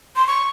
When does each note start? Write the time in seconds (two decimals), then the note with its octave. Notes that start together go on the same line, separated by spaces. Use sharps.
0.16 C6
0.27 C#6